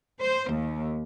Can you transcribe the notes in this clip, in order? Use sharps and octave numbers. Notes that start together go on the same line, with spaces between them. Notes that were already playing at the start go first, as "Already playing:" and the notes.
C5
D#2